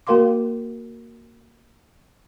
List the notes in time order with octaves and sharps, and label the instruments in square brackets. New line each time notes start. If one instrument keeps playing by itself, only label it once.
[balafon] A#3 F#4 A#4 F5 C6 D6